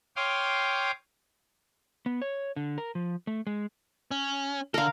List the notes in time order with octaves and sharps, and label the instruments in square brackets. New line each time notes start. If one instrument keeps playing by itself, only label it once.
[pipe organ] C#5 F5 G5 C6 D6 D#6
[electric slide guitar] B3
C#5
D3
A#4
F3
A3
G#3
[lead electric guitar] C#4
[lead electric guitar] D3 A4 [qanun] A#4 F5